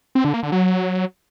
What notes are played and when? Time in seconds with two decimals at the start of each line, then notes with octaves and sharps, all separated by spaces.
0.15 C4
0.24 D3
0.34 A#3
0.43 D3
0.52 F#3